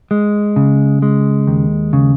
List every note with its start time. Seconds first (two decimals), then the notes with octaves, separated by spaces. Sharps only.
0.11 G#3
0.56 C#3
1.02 G#3
1.47 D#2
1.93 C#3